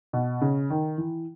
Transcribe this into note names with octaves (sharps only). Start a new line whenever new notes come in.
B2
C#3
D#3
E3